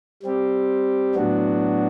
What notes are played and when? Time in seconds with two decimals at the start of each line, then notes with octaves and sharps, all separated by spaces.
0.23 G3 C4 G4
1.15 A2 F#3 B3 D4 F#4